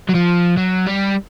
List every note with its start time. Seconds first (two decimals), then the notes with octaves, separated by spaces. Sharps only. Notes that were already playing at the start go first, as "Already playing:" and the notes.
0.09 F#3
0.14 F3
0.57 F#3
0.87 G3